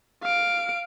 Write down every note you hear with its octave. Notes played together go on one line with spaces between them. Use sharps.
F5 D7